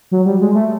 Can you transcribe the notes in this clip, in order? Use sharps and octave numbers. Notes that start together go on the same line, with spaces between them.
F#3
G3
G#3
A3